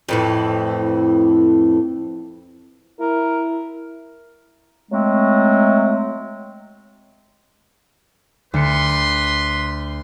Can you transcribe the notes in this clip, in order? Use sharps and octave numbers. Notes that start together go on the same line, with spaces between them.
F2 A2 E3
E4 A#4
F#3 G#3 A3 C4
D2 B4 C6 C#7